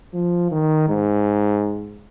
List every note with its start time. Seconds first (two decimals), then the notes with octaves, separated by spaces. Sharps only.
0.13 F3
0.51 D#3
0.89 G#2